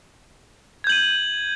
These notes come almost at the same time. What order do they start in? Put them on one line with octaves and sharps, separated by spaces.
G#6 G6 F#7 D#7